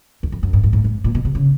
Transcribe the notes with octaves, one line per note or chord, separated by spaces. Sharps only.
E2
F2
F#2
G2
G2
G#2
G#2
A#2
B2
C3
C#3